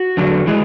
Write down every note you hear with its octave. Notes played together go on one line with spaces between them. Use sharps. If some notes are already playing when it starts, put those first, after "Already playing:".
Already playing: F#4
E2 D3 F#3
E3 G#3